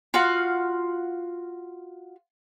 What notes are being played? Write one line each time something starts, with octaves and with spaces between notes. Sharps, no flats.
F4 F#4 F5 F#5